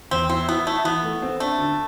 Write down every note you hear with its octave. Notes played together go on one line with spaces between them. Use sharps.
E2 C4
C4 E4
B3 E4
A3 E4
E3 B3
A3
C4
A3 D4
D3